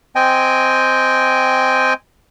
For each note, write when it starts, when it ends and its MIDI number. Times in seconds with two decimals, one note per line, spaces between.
0.16 1.93 60
0.16 1.93 75
0.16 1.93 79
0.16 1.93 80